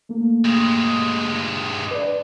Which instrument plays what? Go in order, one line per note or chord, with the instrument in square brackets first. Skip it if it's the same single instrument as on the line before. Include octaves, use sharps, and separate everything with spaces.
[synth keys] A3 A#3
[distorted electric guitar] G2 G#3
[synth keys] B4 D5